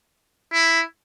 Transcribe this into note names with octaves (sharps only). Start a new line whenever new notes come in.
E4